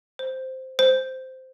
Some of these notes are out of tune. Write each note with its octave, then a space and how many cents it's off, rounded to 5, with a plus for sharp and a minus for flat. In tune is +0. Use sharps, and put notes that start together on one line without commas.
C5 -5
C5 -10